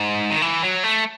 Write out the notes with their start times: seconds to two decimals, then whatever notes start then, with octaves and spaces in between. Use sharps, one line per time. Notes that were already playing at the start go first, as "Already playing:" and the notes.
Already playing: G#2
0.30 D#3
0.42 E3
0.63 F#3
0.84 A3